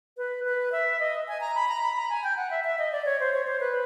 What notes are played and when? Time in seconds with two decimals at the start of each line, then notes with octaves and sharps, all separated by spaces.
0.17 B4
0.45 B4
0.72 E5
1.00 D#5
1.28 G#5
1.40 A#5
1.55 B5
1.68 A#5
1.82 B5
1.96 A#5
2.09 G#5
2.24 G5
2.37 F#5
2.50 E5
2.64 E5
2.79 D#5
2.92 D5
3.05 C#5
3.20 C5
3.34 C#5
3.47 C5
3.60 B4